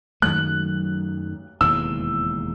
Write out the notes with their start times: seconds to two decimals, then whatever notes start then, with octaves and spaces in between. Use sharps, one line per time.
0.22 F#2 D#3 F#3 A3 F#6
1.61 E1 D#2 C#3 E3 E6